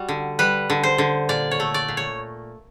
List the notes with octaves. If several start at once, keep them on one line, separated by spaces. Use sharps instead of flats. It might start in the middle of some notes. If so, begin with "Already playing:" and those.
Already playing: G3 F#4
D3
G3 B4
D3
C5
D3
A#2 D5
C#5
A3
D5
A#2
C#5